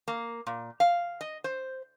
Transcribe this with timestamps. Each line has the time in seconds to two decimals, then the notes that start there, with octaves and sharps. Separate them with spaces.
0.08 A#3
0.47 A#2
0.80 F5
1.21 D#5
1.44 C5